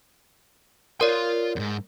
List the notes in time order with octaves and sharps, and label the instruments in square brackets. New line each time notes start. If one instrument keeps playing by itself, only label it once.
[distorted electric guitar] F4 C6 [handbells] A#4 C#5 D5
[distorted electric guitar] E2 G#2